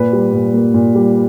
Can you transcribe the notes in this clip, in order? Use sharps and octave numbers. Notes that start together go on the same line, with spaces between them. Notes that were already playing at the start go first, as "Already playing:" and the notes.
Already playing: A#2 B4
G3
A#2
A#3
A#2
G3